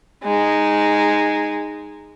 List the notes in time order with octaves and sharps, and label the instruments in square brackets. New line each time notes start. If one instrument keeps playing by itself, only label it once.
[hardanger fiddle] G#3 D#4